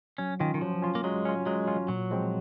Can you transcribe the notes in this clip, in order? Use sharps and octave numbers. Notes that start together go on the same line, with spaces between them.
F#3 C#4
D#3 C#4 F4
D#3
F3 F#3
C#4 F4
A#3
F#3 G#3
C#4 F4
F#3 G#3
C#4 F4
A#2 F#3
F3 G#3 C4